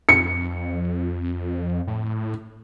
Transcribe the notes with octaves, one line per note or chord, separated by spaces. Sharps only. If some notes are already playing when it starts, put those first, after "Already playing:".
F2 C#7
A2